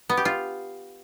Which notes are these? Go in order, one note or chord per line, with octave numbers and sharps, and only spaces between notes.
B3
G4
F4